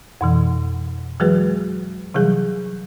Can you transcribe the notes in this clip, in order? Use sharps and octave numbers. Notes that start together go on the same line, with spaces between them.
F2 B2 E3
E3 F#3 G#3 F#4 G#4 B4
C3 E3 F#3 G3 G#4